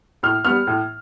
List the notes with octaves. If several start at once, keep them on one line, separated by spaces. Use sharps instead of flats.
A2 F6
G3 B3 F6
A2